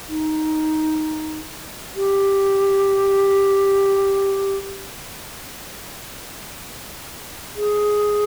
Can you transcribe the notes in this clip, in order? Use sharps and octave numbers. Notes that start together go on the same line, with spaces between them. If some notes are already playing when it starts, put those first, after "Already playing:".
D#4
G4
G#4